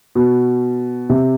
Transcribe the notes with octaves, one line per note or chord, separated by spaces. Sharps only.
B2
C3